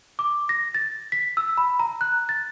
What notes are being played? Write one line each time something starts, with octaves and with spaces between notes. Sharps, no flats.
D6
A#6
A6
B6
E6
B5
A#5
F#6
A6